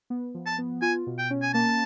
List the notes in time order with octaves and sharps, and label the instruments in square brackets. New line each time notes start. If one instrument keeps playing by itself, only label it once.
[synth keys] B3
F3
[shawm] A5
[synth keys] B3
[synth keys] F4 [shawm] G#5
[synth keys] B2
[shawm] G5
[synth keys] C#4
[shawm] G#5
[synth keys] A#3 [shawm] A5